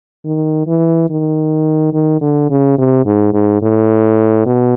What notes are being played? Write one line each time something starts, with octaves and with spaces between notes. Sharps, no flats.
D#3
E3
D#3
D#3
D3
C#3
C3
G#2
G#2
A2
B2